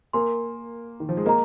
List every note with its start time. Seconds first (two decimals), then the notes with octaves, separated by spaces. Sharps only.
0.13 A#3 A#4 G#5 C6
1.00 D#3
1.09 F3
1.17 G#3
1.25 A#3 G#4 D#5 A#5